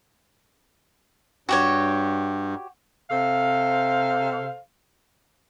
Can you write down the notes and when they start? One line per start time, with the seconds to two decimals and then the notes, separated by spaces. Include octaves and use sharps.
1.49 G2 F#4 G4 C#5
3.10 C3 A4 C5 F5